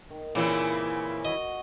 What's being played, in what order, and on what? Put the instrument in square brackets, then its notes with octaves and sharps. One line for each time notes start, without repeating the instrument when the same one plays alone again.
[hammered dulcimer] D#3
[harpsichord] A#2 [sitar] C#3 E3 C4 [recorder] E4
[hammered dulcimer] F#4 [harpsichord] D#5